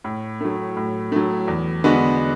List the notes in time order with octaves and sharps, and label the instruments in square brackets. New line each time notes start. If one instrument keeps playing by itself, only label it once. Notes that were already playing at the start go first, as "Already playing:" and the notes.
[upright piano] A2
F#3 A3
A2
F#3 A3
E2
D3 G#3 B3 F#4